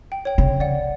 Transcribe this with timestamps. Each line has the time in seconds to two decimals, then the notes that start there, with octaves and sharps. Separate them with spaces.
0.12 G5
0.25 C#5 G5
0.38 C#3
0.60 D5 F#5